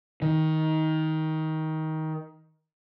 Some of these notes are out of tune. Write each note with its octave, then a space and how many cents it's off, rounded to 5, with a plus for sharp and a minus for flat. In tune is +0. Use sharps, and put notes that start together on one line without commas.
D#3 +20